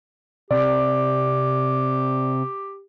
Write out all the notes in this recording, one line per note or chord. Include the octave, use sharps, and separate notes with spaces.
C3 G4 D5